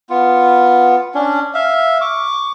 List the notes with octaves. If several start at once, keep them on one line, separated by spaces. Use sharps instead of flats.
B3 F4
C#4 D4
E5 F5
C#6 D6